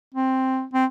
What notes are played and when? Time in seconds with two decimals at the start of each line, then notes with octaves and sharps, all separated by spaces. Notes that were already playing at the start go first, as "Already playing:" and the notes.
0.14 C4
0.73 C4